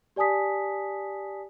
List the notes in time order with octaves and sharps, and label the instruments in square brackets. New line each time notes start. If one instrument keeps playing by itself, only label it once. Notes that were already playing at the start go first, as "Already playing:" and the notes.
[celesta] G4 D5 G#5 A5 D#6 B6